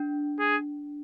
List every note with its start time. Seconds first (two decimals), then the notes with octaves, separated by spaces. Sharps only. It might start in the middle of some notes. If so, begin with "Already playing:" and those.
Already playing: D4
0.40 G#4